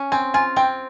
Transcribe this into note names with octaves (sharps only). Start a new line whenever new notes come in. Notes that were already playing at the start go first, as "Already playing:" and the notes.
Already playing: C#4
C4 G#5
F4 G#5
C4 G5